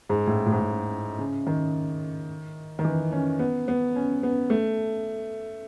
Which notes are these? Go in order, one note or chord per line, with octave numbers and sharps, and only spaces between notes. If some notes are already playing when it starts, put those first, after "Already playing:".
G#2
A2
A2
G#2
A2
C#3
D#3
D#3
E3
C#4
B3
B3
C#4
B3
A3